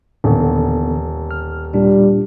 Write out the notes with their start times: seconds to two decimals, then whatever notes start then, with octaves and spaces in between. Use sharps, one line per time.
0.24 D#1 D3 E3 B3
1.31 F6
1.74 A#2 G3 D4